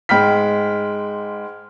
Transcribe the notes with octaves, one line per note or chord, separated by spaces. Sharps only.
G#2 G#3 G5 B5 F6 B6